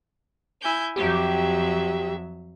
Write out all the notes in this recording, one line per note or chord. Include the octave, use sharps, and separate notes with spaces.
E4 G#5 G6
F2 F#3 G4 E5